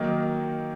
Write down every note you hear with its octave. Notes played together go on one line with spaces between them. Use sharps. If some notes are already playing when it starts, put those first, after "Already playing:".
Already playing: D#3 F#3 A#3 D#4